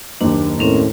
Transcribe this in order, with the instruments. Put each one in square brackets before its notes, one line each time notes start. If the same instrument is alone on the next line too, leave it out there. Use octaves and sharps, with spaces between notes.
[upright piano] F#1 D#2 [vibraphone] D4
[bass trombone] A2 [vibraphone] C4 C#4 A#4